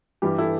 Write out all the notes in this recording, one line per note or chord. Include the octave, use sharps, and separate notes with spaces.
G2 E3 G3 G4
E4 A4